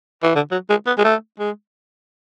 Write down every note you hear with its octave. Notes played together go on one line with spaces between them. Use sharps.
E3
D3
F#3
G#3
B3
G#3
A3
G#3